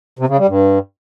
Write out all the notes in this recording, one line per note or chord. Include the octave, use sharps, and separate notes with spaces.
C3
C#3
G3
G2